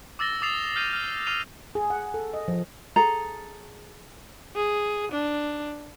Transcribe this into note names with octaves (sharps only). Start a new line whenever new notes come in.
D6 E6 A6 A#6 G7
D6 D#6 A6 C7 F7
F6 G6 C7 D#7
F6
D#6 F6 C7 D#7 F7
G#4
F#5
A4
D#5
F3
G#4 A4 A#5
G#4
D4